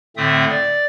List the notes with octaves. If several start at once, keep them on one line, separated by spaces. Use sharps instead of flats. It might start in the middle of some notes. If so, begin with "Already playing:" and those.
A2 D3 A3 C4 E5 D#6
D5